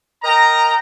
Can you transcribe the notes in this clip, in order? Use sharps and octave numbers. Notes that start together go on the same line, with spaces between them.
A#4 D#5 G5 A#5